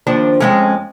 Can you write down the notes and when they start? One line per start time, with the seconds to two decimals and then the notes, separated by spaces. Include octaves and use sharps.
0.07 D#2 F3 D4
0.41 F2 G#3 C#4